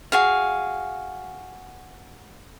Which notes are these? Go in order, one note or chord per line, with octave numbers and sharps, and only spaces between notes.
F#4 G#4 F5